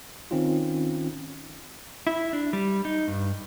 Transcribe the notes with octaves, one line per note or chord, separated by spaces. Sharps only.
D#3 C4 C#4 D#4 F4
E4
D4
G3
D#4
G2